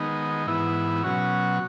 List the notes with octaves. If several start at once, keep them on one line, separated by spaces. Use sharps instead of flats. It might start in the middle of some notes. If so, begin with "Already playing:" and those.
Already playing: D#3 G#3 B3 D#4
G#2 E3 B3 E4
B2 F#3 C#4 F#4